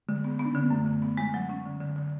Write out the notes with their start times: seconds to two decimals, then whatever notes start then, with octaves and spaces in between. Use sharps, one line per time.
0.08 D3 G#3
0.24 B3
0.39 B3
0.45 D4
0.54 D3 C#4
0.63 B3
0.71 F#2 A3
0.86 D3
1.02 B3
1.17 G#3
1.34 F#3
1.49 C#4
1.66 D3
1.80 D3
1.96 D3